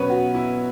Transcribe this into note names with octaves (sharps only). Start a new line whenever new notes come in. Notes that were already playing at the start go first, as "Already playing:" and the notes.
Already playing: B2 F#3 B3 C#4 B4 C#5 C#6
F#4
E4